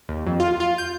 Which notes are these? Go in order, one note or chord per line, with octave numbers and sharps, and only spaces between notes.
D#2
F2
F4
F4
G6